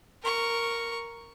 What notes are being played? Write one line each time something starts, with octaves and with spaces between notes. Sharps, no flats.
A#4 C#6